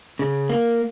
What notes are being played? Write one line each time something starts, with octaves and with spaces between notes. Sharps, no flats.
C#3
A#3